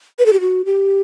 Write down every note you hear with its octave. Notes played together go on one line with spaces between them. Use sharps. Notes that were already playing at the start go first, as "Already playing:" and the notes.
B4
A4
G4
F#4
G4